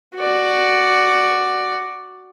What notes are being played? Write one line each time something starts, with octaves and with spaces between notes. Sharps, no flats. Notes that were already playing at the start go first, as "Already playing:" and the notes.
F#4 D5